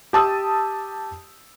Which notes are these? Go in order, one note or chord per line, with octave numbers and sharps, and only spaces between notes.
G4 A5 D#6 E6